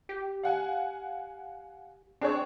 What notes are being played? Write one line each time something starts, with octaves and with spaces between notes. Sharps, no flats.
G4
F5 F#5 G#5
C4 D4 G#4 C#5